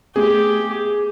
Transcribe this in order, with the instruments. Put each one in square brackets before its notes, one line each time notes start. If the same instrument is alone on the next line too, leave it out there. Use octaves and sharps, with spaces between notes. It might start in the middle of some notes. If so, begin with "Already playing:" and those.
[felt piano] A3 B3 [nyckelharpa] G4 [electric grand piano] G#4